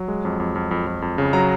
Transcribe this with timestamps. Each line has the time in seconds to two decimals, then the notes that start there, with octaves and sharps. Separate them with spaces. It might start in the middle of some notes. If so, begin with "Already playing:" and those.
Already playing: F#3
0.08 G#3
0.25 F2
0.40 F2
0.56 F2
0.71 F2
0.87 F2
1.02 F2
1.18 C#3
1.33 F#3 A#5